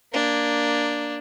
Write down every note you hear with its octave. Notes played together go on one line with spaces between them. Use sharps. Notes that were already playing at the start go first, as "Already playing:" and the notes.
A#3 D4